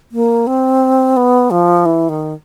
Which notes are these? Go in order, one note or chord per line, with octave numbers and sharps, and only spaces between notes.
A#3
C4
B3
F3
E3
D#3